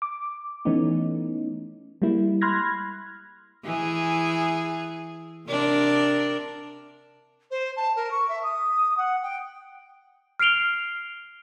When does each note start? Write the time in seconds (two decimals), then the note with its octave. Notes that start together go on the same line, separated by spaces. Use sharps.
0.02 D6
0.65 E3 A3 B3 C#4 D#4
2.02 G3 G#3 A#3 E4
2.41 B5 C6 F6 F#6 G#6 A#6
3.64 E3 G#4
5.47 C3 D4 A#4
7.50 C5
7.76 A5
7.96 A#4
8.11 C#6
8.28 E5
8.43 D#6
8.97 F#5
9.22 G5
10.39 F6 C7 D7 F7 G7